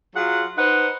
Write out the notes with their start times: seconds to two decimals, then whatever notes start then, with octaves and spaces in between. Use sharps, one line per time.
0.16 F#3 F4 G#4 F#5
0.58 D#4 B4 C5 F#5